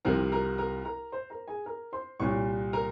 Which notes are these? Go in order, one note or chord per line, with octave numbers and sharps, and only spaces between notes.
C2 C3 F3 A#4 A#5
A#4 A#5
A#4 A#5
A#4 A#5
C5 C6
A#4 A#5
G#4 G#5
A#4 A#5
C5 C6
C2 A#2 G3 C#5 C#6
A#4 A#5